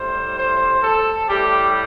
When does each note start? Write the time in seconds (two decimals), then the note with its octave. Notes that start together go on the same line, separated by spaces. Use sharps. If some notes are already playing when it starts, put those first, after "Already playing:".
Already playing: A2 G3 C5
0.37 C5
0.83 A4
1.29 A2 G3 G4